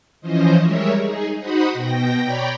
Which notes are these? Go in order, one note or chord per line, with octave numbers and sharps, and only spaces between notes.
E3 F3 C#4 C5 D#5
G3 G#3 A#4 C#5 E5
D#4 G#4
D#4 F#4 C5 F#5 B5 D#6
B2 G5 A#6
C#5 D5 G5 A#5 B5